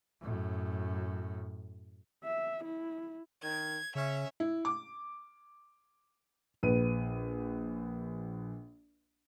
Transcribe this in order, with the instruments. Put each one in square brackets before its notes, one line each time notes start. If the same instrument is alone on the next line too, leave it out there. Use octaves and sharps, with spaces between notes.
[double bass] F#2 A2
[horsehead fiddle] E5
E4
[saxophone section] D#3 [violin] G#6
[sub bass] C#3 [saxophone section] C#4 [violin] E5
[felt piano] E4
D6
[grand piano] A#1 B4 D#7